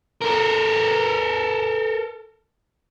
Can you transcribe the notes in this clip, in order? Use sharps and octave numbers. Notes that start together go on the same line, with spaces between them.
A4 A#4